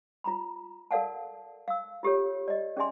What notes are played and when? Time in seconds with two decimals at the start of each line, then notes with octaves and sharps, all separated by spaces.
0.24 F4 A#5 B5
0.91 A4 A#4 D5 F5 F#5 A5
1.68 F5 E6
2.03 F4 G4 A4 C#5
2.48 D5 D#5
2.77 C#4 G#4 D5 E5 G#5 C6